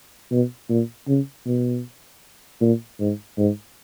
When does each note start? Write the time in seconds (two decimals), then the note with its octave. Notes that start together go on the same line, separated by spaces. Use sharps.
0.31 B2
0.69 A#2
1.07 C#3
1.46 B2
2.61 A#2
3.00 G#2
3.38 G#2